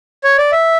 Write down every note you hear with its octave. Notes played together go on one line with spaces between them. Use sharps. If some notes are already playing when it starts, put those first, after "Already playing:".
C#5
D5
E5